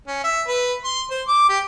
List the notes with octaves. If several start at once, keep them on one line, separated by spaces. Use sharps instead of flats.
C#4
E5
B4
C6
C5
D6
G4